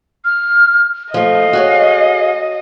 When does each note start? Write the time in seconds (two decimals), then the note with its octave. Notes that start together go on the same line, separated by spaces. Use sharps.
0.25 F6
1.14 F3 A3 D#5 F5
1.53 F#4 G#4 C#5